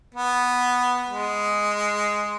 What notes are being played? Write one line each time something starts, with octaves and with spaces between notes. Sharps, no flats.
B3
G#3